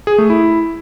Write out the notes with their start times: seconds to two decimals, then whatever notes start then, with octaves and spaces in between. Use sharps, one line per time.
0.07 G#4
0.18 A3
0.30 E4